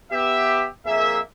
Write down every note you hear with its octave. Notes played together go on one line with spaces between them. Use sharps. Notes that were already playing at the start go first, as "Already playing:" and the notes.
B3 G4 E5
F2 A#3 G#4 A#4 E5